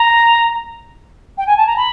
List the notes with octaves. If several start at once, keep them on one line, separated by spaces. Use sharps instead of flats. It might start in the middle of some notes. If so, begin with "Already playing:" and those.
Already playing: A#5
G5
G#5
A5
A#5
B5